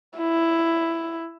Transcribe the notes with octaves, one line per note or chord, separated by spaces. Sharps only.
E4